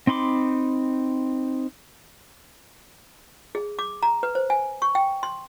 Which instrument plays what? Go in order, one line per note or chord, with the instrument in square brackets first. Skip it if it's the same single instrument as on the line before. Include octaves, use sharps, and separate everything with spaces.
[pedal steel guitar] C4 D#4 B5 C6 D6
[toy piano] G#4
D6
A#5
B4
C5
G#5
C#6
G5
C6